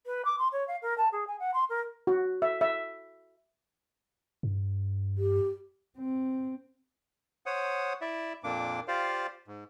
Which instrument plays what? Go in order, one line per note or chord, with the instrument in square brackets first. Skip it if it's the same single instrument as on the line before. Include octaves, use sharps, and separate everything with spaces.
[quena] B4
D6
C6
C#5
F5
A#4
A5
G#4
G#5
F#5
C6
A#4
[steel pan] F#4
E5
E5
[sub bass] G2
[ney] G4
[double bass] C4
[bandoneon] C5 C#5 F#5 D#6
E4 D5 E5
F2 A#2 A#3 D4 D6
F4 G4 C5 D5 F5
G#2